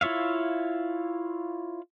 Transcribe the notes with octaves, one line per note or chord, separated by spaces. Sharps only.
E4 F4 C#5 E5 F5